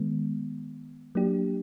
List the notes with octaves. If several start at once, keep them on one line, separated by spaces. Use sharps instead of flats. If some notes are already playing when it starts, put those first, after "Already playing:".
Already playing: D#3 G#3 B3
F#3 A#3 D4 G4